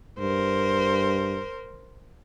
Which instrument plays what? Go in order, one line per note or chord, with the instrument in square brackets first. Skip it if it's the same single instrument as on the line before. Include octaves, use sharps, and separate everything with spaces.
[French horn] G2 [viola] A#4 C5